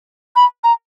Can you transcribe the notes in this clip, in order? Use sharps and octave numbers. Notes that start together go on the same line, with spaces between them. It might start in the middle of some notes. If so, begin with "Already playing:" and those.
B5
A#5